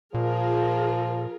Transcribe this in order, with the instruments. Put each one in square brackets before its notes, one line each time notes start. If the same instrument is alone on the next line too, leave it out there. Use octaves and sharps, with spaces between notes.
[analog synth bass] A#2 [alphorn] F3 [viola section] F4 G#4 A#4